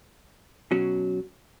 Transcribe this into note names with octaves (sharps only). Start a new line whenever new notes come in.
B2 F#3 C#4 F#4